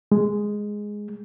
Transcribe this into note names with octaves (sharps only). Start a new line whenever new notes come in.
G#3